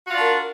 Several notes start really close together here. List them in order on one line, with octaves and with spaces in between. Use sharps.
F#4 F4 D5 D4 A#4